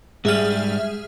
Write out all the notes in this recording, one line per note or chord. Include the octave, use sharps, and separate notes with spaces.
G#2 G3 G#4 E5 F6